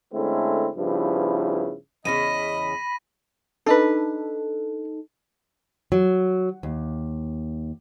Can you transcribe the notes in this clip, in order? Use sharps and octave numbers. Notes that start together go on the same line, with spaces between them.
D3 G#3 A3 C4 C#4 E4
G2 C#3 F3 B3 E4
E2 C#3 C#4 D#5 B5 A#6 D#7
D4 D#4 A4 B4
F#3
D#2